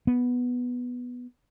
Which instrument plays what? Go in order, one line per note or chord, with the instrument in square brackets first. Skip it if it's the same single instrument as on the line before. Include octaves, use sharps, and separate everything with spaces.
[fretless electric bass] B3